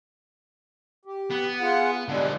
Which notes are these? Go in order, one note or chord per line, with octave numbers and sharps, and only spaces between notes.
G4
B3
F4 G#4 F#5
D3 F3 G3 G#3